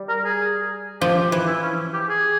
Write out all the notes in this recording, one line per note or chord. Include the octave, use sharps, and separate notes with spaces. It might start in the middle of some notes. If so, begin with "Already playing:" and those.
Already playing: G3
A#4
G#4
F3 G4
G4
E3
E4
C#4
G4
G#4